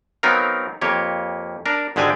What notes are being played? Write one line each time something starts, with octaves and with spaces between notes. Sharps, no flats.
F#3 B3 C4 D#4 A#4 F5
F2 A#3 G4 C#5
D4 A#4
G#1 D3 G#3 G4 D5 G#5